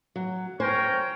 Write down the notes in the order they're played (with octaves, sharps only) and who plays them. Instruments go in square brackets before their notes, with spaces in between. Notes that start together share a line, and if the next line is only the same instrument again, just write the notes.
[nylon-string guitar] F#3
[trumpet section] A#4 C#5 G5 [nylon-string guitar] C5 G#5